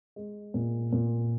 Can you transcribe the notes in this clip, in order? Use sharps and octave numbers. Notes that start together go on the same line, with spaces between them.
G#3
A#2
A#2